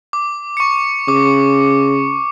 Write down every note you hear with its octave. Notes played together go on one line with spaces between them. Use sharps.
D6
C#6 C#7
C#3 D6